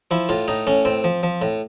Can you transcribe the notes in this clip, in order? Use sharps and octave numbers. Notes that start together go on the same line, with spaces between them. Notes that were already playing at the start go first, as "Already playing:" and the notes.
F3 E4
A2 F4
A2 D#4
A2 C#4
A2 C4
F3
F3
A2